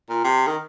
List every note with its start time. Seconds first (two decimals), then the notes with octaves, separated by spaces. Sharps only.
0.09 A#2
0.24 C3
0.47 D#3